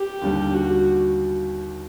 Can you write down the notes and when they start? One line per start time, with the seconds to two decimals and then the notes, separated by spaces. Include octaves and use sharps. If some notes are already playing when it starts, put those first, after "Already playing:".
Already playing: G4
0.22 D#2 D3 G3
0.53 F#4